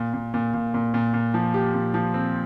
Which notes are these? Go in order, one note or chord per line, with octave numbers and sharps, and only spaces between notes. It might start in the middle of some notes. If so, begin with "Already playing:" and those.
Already playing: A#2
A#2
A#2
A#2
A#2
A#2
A#2
F3
G4
A#2
F3
C4